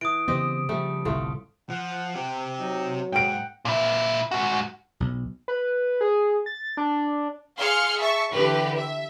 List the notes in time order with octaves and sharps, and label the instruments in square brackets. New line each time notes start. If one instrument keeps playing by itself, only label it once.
[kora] E3 [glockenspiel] D#6 D7
[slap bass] C#3 E3 B3 [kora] C4 G4 D#5
[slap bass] C#3 F3 [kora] G3 A3
[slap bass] G1 C2 [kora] A2 A3 F4
[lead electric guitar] F3 [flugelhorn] F#5
[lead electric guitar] C4 G4
[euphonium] F#3 [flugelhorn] D#4
[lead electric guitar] G#2 [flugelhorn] F#5 [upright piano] G5 D7
[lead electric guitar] A#2 E4
G#2 F#4
[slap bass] B1
[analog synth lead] B4
G#4
A6
D4
[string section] G#4 F5 C6 F6 C#7
E5 A5 C#6
D3 E3 G4 B4
E5